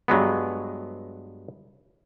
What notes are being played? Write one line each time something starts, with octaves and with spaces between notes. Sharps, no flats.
G2 F#3 G#3 B3